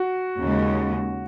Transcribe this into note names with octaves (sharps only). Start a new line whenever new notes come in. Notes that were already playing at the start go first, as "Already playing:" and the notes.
Already playing: F#4
D#2 C#3 G#3